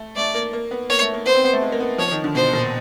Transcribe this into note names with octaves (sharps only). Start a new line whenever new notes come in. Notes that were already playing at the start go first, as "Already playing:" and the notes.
Already playing: A3
A3 D5
A#3
A#3
B3
A#3 C#5
A3
A#3
B3 C5
C4
B3
A3
G#3
A#3
B3
F3 C#5
D#3
D3
B2 C5
A#2